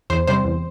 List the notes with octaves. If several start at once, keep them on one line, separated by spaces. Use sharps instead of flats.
E2 C5
C3 G3 C5
E2